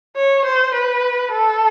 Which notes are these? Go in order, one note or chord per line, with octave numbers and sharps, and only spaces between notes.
C#5
C5
B4
A4